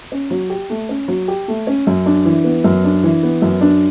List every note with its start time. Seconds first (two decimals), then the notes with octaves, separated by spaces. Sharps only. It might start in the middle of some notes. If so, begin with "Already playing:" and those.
0.12 C#4
0.30 F#3
0.50 G4
0.70 A3
0.89 C#4
1.08 F#3
1.28 G4
1.48 A3
1.67 C#4
1.87 F#2
2.06 D4
2.25 E3
2.44 B3
2.64 F#2
2.84 D4
3.03 E3
3.23 B3
3.42 F#2
3.61 D4